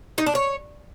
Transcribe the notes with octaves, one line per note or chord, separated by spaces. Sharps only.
D#4
D4
C#5